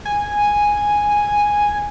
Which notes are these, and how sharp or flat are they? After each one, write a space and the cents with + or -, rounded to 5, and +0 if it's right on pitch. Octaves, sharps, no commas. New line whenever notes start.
G#5 -5